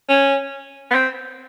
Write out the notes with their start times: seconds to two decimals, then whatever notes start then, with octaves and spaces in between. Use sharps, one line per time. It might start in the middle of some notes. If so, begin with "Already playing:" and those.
0.09 C#4
0.91 B3
0.94 C4